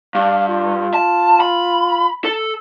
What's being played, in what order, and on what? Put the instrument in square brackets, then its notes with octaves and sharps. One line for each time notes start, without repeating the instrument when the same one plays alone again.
[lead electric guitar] G2 [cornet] F5
[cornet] F4
[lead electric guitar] A5
B5
A4